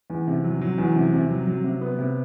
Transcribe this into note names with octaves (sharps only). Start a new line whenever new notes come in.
E2
C3
F#3
F#3
E2
C3
C3
F#3
F#3
C3
B3
C3